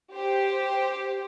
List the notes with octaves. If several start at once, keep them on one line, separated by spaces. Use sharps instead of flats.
G4 C5